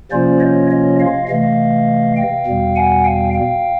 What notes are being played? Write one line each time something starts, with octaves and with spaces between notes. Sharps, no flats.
C3 F3 A#3 C#4 F4 C5 D5
C#5 D#5
C#5 D#5
D#5 F5
C3 E3 A3 D#5 F5
F5 G5
E2 B2 G3
F#5 G#5
F5 G5
F5 G5